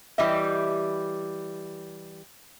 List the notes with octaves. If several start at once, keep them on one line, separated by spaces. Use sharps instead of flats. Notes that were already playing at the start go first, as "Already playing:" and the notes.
E3 G3 G4 D#5 E5